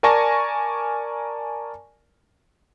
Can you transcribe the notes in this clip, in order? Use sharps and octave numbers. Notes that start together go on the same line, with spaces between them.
A#4 D5 G#5 A5 C#6 A#6